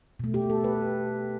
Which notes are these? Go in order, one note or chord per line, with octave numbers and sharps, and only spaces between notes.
B2 A3
G4
A4
B4